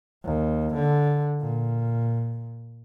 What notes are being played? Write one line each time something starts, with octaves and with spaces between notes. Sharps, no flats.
D#2
D3
A#2